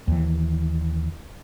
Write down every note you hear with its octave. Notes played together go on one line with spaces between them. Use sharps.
D#2 E3